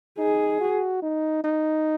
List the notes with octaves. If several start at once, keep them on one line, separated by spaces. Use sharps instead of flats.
D#4 G#4
F#4
D#4
D#4